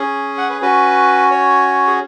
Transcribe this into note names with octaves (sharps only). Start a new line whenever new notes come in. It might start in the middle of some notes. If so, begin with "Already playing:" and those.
Already playing: C#4 G#4
F#5
B4
C#4 F#4 B4
C#5
G#4